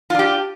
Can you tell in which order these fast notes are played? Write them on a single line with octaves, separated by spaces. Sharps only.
F4 D4 G4